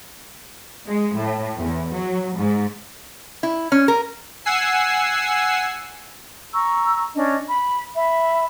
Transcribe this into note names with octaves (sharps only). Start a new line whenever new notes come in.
G#3
A2
E2
F#3
G#2
E4
C#4
A#4
F#5 G#5 E6 C7
A#5 C#6 E6
C#4 D4 D#5
B5
E5 B5